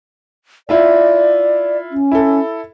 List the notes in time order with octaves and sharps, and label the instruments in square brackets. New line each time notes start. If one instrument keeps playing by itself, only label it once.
[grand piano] E4 F4 E5 [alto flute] D5
[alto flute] C#4
[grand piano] E4 A4